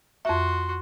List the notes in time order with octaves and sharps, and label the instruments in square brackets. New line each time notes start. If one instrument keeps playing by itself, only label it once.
[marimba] F2 E5 [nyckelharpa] F#4 C6